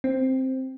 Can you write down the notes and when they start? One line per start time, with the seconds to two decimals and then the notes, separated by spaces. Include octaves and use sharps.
0.04 C4